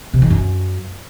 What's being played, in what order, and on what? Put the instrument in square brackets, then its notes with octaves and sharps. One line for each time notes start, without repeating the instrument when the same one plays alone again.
[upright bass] C3
D#3
F#2